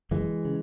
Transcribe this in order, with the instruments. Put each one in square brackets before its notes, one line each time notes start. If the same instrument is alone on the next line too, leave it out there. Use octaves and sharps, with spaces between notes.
[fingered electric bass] F#1 E3 G#3
C#3